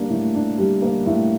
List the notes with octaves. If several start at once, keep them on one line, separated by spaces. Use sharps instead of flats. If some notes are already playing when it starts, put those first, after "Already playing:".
Already playing: G3 A#3 D4
A2
D4
G3
A#3
A2